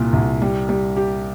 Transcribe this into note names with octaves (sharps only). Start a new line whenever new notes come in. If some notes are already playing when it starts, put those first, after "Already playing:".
Already playing: C2 A#2
C2
G3
G3
G4